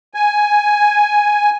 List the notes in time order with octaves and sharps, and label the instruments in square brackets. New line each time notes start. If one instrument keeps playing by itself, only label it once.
[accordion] G#5